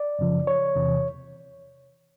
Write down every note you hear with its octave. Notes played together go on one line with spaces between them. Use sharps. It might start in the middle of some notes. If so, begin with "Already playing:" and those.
Already playing: D5
F#2 C#3 F3
C#5
E2 C3 E3